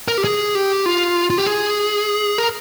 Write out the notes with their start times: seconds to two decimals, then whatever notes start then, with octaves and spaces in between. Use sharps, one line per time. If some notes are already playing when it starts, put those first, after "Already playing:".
0.08 A#4
0.18 G4
0.24 G#4
0.55 G4
0.86 F4
1.30 F4
1.38 G4
1.46 G#4
2.38 A#4